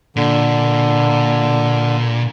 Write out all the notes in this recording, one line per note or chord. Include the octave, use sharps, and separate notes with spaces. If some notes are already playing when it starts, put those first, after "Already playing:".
A#2 D3